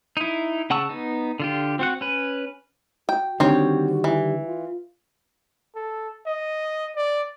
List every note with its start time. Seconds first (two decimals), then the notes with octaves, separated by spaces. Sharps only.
0.17 D#4 E4
0.70 C#3 F#5 A5 C#6 E6
0.89 B3 D#4
1.40 D3 F4 G4
1.79 C4 F#4 F#5
2.01 C#4 B4
3.09 F#4 G5
3.40 D3 D#3 G3 C4 F#4 C#5
4.04 E3
4.47 F4
5.76 A4
6.26 D#5
6.96 D5